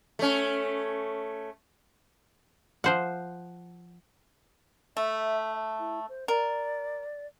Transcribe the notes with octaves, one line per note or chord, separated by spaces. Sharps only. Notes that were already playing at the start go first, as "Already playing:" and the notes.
A3 C#4
F3 C5 F#5
A3 E5
E4
C5
A#4 D5